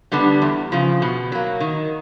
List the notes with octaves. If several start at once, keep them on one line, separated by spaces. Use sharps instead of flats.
D3 G3 B3 D4
E2
C#3 F3
B2
F#3 A#3
D#3